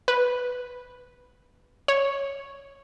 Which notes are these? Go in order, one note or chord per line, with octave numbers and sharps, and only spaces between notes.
B4
C#5